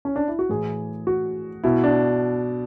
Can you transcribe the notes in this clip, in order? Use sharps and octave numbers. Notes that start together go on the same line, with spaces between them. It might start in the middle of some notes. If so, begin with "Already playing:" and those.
C#4
D4
E4
F#4
A2 E3 G#4
F#4
B2 E4
D4